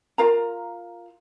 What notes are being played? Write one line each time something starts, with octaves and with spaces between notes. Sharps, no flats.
F4 A#4 F5 A#5